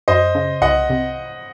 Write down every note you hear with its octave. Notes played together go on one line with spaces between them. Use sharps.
F#2 C5 D#5
C#3
C2 D#5 F#5
C3